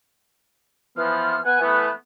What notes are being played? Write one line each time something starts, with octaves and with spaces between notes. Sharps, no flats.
E3 F3 B3 F6
B3 F#5 G#5 F#6
E3 A3 B3